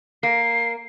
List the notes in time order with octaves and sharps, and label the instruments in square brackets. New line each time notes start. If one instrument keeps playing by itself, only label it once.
[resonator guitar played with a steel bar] A#3 [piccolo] C7